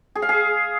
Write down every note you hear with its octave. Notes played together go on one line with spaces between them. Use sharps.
G#4
F5
G#4